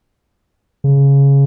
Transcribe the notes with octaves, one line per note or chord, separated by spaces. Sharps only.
C#3